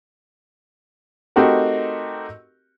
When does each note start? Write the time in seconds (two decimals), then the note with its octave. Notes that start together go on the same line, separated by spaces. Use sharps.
1.36 A3 C4 D#4 F#4 G4 A#4